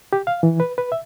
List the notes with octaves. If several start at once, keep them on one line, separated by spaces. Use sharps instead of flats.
G4
F5
E3
B4
B4
E5